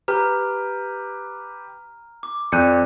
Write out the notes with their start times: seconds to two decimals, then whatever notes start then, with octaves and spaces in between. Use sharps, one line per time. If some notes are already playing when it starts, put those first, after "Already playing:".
0.08 G4 B4 A#5 F6
2.23 D6
2.52 F2 D5 F#6 G6 C#7 D#7